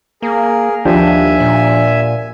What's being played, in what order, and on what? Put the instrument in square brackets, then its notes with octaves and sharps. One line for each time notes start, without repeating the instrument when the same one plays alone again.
[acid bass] A#3 [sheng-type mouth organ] G#4 A#4
[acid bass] D#2 [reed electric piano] F3 D4 G4 [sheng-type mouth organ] E5 G#5
[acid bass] A#2